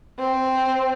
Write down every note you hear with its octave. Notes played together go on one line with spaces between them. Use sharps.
C4